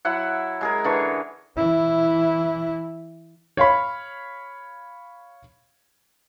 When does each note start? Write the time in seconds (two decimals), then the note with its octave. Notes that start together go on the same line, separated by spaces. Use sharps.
0.05 F#3 E4 F#5
0.61 G#3 G#4 A#4
0.84 D3 E3 C#6
1.56 E3 E4
3.57 C#5 F5 B5